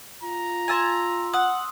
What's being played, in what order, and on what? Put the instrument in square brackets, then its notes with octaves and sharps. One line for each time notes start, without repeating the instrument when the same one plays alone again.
[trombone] F4 [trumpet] A#5
[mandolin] G#5 A5 [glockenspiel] C6 E6 F7
[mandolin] F#5 [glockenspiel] D#6